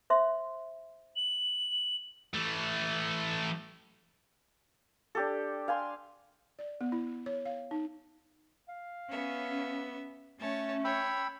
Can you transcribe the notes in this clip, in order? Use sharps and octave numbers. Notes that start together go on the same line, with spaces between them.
C5 E5 C6
F#7
E3 A3
D4 G4 A4
F5 G#5 C6
D5
B3
E4
C#5
F5
D#4
F5
B3 C#4 E5
A3 C#4 C#5 A5
C#5 G5 B5 E6